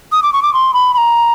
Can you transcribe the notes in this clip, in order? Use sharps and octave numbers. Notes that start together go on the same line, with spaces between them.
D#6
D6
C#6
D6
C6
B5
B5
A#5